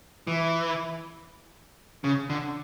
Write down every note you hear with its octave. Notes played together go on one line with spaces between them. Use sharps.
E3
C#3
D3